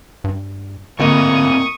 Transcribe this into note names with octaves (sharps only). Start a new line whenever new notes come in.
G2
A2 D3 A#3 C4 F4 D#5 C#6 D#6